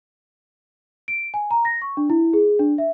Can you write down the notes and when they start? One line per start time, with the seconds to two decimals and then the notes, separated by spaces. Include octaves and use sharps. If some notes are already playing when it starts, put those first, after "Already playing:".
1.08 D7
1.34 G#5
1.51 A#5
1.65 A#6
1.82 C#6
1.97 D4
2.10 E4
2.33 G#4
2.59 D4
2.78 E5